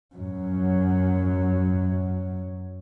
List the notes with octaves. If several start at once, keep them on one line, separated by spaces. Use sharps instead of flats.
F#2 F#3